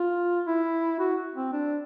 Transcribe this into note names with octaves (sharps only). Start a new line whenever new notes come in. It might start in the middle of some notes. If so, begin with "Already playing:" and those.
Already playing: F4
E4
F#4
C4
D4